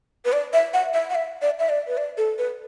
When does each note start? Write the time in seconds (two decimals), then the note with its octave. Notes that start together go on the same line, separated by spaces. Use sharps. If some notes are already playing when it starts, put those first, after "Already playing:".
0.25 B4
0.33 D5
0.53 E5
0.74 F#5
0.94 E5
1.10 F#5
1.15 E5
1.42 D5
1.59 E5
1.69 D5
1.88 B4
1.97 D5
2.17 A4
2.38 B4